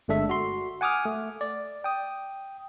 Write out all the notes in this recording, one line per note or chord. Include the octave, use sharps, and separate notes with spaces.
G1 G#3 A3 D4 A4 E5
F#4 C6
F#5 G#5 D6 D#6 F6
A3
D5
G5 D#6